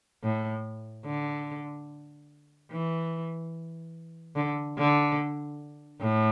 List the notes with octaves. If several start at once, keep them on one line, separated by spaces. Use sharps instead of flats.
A2
D3
E3
D3
D3
A2